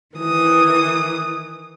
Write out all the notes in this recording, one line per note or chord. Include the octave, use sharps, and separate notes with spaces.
D#3 E3 D#6